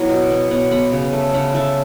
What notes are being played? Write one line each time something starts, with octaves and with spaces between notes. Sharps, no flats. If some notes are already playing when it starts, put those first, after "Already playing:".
Already playing: F#3 B3 E4
B2
B3
B2 C#5 F#5
B3 F#5 B5
C#3
A3
C#3 F#5 B5
A3 E5 A5